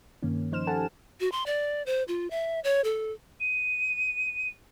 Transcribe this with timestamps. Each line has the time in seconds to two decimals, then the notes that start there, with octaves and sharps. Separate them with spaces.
0.22 G2 C3 D#3 A#3 C#4
0.52 F3 D#4 C5 F6 E7
0.67 G4 A4 C5 F#5 G#5 A5
1.20 F#4
1.32 C6
1.46 D5
1.86 C5
2.08 F4
2.31 E5
2.64 C#5
2.84 A4
3.40 D#7